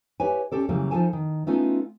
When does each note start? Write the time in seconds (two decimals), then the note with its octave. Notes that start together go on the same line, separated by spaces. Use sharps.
0.20 G4 B4 C#5 E5 G#5
0.52 C#4 G4 A4 D5
0.69 C#3 E3 F#3 G3 A#3
0.91 F3 D#4 F4 A4 G#5 A5
1.13 D#3
1.47 A3 B3 C#4 D#4 F4 A4